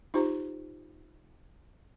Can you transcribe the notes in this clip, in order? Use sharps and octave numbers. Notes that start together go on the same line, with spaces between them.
D#4 F4 G4 C5 A#5